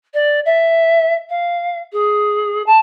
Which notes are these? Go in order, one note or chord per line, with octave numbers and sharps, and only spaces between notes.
D5
E5
F5
G#4
A5